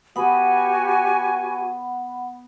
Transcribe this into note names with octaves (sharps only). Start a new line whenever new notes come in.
B3 F#4 G4 F#5 G#5 B5